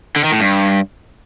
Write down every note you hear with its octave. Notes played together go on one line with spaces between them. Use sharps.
D3
D#3
A2
G2